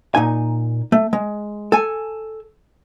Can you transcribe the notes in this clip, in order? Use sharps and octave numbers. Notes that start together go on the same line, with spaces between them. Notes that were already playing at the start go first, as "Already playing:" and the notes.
A#2 D#4 G#5
A3
G#3
A4 G#5